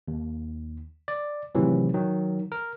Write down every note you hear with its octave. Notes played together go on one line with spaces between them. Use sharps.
D#2
D5
A2 C3 D#3 E3 F#3
D#3 F#3
A#4